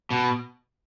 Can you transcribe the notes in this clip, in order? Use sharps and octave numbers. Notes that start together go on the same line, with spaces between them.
B2